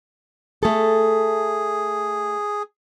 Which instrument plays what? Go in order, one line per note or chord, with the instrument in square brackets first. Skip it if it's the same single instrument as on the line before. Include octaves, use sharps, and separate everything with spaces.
[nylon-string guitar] A3 A4 [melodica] G#4